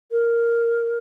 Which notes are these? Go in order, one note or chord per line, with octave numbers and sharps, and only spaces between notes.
A#4